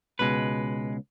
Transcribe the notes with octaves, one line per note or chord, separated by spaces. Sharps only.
C#2 B2 G#3 B4